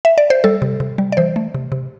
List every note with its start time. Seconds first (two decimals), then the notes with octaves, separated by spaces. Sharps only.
0.05 E5
0.18 D5
0.30 C5
0.44 G3 A4
0.62 C3
0.80 C3
0.98 G3
1.12 D5
1.17 E3 C5
1.36 A3
1.54 C3
1.72 C3